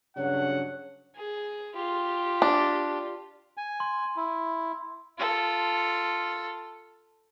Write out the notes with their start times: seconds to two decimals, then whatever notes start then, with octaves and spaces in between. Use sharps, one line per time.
0.17 G2 C#3 F#3 D4 C#5 F#5
1.16 G#4
1.75 F4 G4
2.42 D4
3.57 G#5
3.80 C6
4.17 E4
5.18 F4 A4